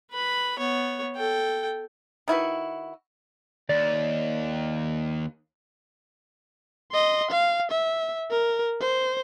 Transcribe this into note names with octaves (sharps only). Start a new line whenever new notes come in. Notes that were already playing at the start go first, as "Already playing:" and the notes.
B4 B5
B3 C#5
A4 G5
D#3 E4 F#4 B4
D#2 D5
D#5 C6
F5
E5
A#4
C5